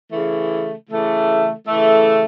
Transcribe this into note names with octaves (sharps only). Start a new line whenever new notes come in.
C#3 E3 A3
C#3 E3 A3
C#3 E3 A3